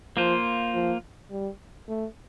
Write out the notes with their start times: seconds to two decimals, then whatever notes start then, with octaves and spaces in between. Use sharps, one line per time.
0.17 F3 A#3 F4 C5
0.75 F3
1.31 G3
1.88 A3